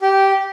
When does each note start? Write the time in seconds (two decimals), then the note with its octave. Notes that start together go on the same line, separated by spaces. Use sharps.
0.02 G4